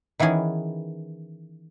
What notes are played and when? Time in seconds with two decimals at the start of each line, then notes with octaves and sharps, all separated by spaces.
0.19 D#3 E3 B3 C#4 G#4